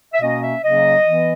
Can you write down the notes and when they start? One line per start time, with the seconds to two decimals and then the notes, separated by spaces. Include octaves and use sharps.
0.14 E5
0.22 B2 A#3 C#4 D#5
0.43 E5
0.64 C#3 F#3 A#3 C#4 D#5
1.05 E3 B3